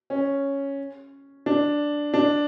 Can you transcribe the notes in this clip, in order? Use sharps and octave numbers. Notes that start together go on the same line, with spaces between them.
C#4
D4
D4